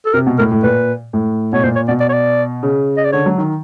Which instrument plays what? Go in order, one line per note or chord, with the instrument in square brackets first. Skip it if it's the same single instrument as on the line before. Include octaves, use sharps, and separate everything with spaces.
[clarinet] A4
[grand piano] C3 [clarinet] A#4
[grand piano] B2
[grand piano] A2 [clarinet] A#4
[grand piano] A2
[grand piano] A#2 [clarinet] B4
[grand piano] A2
[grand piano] B2 [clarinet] C#5
[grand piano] A#2 [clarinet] C5
[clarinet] C#5
[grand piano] B2 [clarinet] D5
[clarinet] D5
C#5
D5
[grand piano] C#3
[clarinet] D#5
D5
[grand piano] D3 [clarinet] C#5
[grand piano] F#3
D#3